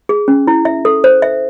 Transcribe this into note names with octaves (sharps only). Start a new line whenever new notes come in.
G#4
C#4
E4
E5
A4
C5
E5